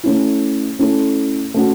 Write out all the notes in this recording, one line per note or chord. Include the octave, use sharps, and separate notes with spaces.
A3 C#4 E4
A3 C#4 E4 A4
A3 C#4 F#4